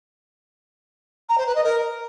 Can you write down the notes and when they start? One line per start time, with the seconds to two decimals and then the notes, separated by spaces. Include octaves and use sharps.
1.29 A#5
1.38 C5
1.46 B4
1.55 D#5
1.64 A#4